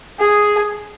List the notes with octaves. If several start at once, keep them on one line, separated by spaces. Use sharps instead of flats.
G#4